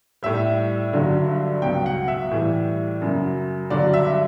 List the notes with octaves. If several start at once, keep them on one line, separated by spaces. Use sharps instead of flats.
A2 G3 E5
G2 D3 F#3
C#2 B2 F#3 G5
F#5
E5
A2 E3 G3
F#2 C#3 F#3
G2 D3 F#3 D5
E5